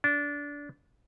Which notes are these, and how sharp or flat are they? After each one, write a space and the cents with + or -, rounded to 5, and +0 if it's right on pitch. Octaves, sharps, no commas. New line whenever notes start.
D4 -20